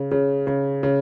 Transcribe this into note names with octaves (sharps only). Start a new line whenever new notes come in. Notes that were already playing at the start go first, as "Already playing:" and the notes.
Already playing: C#3
C#3
C#3
C#3